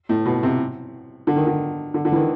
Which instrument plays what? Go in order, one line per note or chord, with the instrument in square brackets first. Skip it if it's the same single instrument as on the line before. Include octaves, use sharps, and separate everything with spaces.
[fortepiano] A2
B2
C3
D3
D#3
D3
D3
D3
E3
D#3